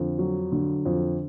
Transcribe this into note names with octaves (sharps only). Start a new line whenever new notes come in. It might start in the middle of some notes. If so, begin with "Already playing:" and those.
Already playing: F2 D3
F#3
D3
F2